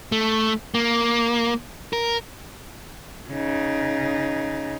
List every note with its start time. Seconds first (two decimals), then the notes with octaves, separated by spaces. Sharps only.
0.12 A3
0.74 A#3
1.93 A#4
3.30 C#3 D#4